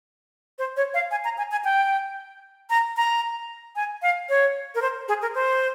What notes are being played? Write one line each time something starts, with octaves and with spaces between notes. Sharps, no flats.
C5
C#5
F5
G#5
A#5
G#5
G#5
G5
A#5
A#5
G#5
F5
C#5
A#4
C5
G#4
A#4
C5